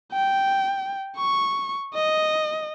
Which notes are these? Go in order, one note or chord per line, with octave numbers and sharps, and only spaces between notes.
G5
C#6
D#5